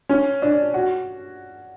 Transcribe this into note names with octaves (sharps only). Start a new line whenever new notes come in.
C#4
D4
F#4